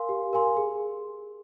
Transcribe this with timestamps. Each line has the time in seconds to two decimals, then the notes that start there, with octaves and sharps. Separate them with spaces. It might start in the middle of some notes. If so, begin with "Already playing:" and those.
Already playing: A#4 F5 G#5 C6
0.09 G4
0.33 A#4 F5 G#5 C6
0.57 G#4